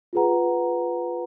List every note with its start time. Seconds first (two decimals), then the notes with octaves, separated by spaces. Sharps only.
0.13 F4 G#4 B4 F#5 A#5